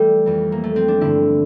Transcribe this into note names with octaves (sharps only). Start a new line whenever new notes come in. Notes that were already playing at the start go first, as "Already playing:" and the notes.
Already playing: E3 G3 A3
F2 E3
A#3
A3
C4
D4
G2 D3 E4